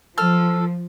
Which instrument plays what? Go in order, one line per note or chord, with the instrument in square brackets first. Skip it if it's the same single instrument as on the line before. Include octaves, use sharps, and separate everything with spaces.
[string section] F3 [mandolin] A4 F6